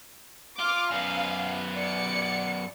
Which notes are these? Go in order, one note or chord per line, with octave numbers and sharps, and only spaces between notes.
F4 D6 F6
F#2 B3 F5
D5 C#7